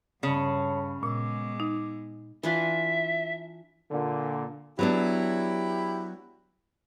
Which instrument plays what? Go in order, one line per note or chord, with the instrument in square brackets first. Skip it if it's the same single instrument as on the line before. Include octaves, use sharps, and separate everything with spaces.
[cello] G2 [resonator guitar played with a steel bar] C#3 [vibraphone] C#5 A5 B5
[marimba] A#2 [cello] G#3 B3 [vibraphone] D6 E6
[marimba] D#4
[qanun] E3 D4 F4 [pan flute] E5
[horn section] A#2 D3
[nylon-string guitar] F#3 B3 D4 [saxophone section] E4 G4